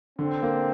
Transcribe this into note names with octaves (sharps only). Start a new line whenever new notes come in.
D3 C4
A#3